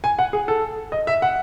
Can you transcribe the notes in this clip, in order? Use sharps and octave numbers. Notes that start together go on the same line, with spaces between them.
G#5
F#5
G#4
A4
D#5
E5
F#5